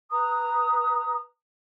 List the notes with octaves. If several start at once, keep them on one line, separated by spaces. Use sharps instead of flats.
B4 A#5 D#6